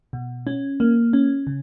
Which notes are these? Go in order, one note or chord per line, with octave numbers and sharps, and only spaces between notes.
B2
C#4
A#3
C#4
C#3